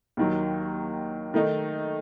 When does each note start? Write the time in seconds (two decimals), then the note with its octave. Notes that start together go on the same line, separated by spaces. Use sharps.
0.17 D#2 D#3 F#3
1.34 D#3 A3 D#4